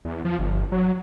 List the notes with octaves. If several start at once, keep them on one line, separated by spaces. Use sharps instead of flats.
E2
F3
G1
F#3